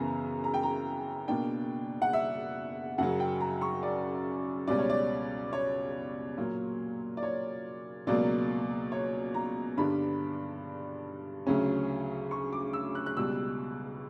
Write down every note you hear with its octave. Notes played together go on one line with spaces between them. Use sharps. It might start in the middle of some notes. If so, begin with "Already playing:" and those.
Already playing: F#2 C#3 E3 B3 A#5
A#5
G5
A#5
B2 A#3 D4 G5
F#5
E5
F#2 C#3 F#3 F#5
G5
A#5
C#6
D5
C#2 B2 G3 C#4 D5
C#5
D5
C#5
A#2 F#3 A#3
D5
C#5
C#2 B2 F#3 A#3 D5
C#5
A#5
G2 D3 G3 B3 D4 B5
D2 C#3 F#3 C#4
C#6
D6
E6
F#6
F#6
C#2 B2 G3 E6